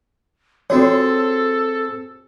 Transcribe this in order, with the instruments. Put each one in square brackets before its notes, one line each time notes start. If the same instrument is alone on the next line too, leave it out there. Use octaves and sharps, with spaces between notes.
[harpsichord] C4 G#4 [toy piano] F4 F#4 C#5 [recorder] A4